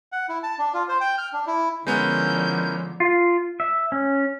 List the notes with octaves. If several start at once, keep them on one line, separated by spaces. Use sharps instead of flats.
F#5
E4
A5
D4
F4
C5
G5
F6
D4
E4
D3 F3 G#3 B3 C#4 E4 A#4 G6
F4
E5
C#4